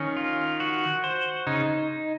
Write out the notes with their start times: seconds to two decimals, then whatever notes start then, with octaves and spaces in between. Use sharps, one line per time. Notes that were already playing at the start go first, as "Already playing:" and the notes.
Already playing: D#3 C#4
0.16 F4
0.60 F#4
1.04 C5
1.47 C#3 D#4